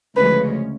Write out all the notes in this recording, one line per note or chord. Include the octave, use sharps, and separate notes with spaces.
D2 C#3 F3 G#3 C#4 B4